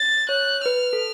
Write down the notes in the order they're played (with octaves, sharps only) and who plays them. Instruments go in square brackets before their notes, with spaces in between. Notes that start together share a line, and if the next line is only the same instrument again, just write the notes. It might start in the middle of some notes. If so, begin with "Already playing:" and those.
Already playing: [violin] A6
[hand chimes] C#5 [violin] F#6
[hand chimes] B4 [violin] F6
[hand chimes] A4